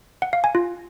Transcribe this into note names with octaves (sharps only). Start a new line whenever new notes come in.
F#5
F5
G#5
F4